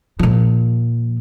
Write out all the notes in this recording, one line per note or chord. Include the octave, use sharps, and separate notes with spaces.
A#2 F3